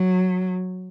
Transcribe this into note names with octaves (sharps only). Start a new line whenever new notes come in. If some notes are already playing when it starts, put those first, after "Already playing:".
Already playing: F#3